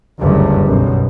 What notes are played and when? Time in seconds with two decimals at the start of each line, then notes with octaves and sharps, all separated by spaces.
0.20 F#1 D2 G2
0.67 B1 F#2